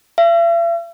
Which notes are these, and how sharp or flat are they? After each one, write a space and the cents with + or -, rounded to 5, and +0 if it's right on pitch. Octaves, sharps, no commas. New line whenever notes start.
E5 +45